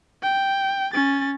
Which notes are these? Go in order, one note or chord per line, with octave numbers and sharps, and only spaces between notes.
G5
C#4 A6